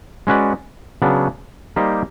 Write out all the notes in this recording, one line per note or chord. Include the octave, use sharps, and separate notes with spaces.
G#3 C#4 F#4 B4 D5
C#3 F#3 B3 D4
G3 A#3 D#4 G4 C5